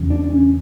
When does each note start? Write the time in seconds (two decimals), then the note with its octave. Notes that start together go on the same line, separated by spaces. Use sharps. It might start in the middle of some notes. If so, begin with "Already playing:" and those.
Already playing: E2 C#3
0.10 D4
0.30 C#4